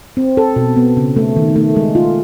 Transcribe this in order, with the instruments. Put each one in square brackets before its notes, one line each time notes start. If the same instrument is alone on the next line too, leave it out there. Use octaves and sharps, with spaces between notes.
[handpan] C4
A4
B2
B3
C#3
A3
D#3
A3
G#3
F4